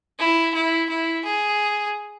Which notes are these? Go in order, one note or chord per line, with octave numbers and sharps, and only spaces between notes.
E4
E4
E4
G#4